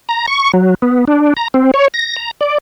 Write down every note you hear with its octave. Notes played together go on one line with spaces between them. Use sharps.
A#5
C#6
F#3
B3
D4
A#5
C4
C#5
A#6
A#5
D5